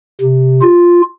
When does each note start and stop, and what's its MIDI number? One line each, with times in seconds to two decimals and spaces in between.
0.21 0.61 48
0.61 1.01 65